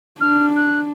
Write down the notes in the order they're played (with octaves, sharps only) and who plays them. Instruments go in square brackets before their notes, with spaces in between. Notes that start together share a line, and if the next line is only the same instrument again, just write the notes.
[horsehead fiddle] D4 [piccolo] F6
[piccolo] F#6